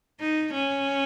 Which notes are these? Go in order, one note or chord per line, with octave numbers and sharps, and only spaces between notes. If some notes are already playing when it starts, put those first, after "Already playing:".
D#4
C#4